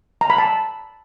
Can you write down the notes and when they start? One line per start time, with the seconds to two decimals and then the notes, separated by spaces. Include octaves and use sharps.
0.21 A#5
0.30 B5
0.38 A5